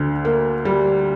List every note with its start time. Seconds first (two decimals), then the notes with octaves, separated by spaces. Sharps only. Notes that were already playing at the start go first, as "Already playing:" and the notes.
Already playing: D2 D3
0.25 A#3
0.65 G3